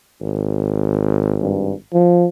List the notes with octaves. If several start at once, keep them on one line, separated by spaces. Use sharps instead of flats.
G#1
G2
F3